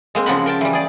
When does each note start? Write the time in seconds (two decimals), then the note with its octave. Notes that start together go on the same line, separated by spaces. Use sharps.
0.15 G#3 A#3 C4
0.26 C#3 F3 F#4 B5
0.46 A#4 G5 A5
0.61 E3 G3
0.73 G#4 D5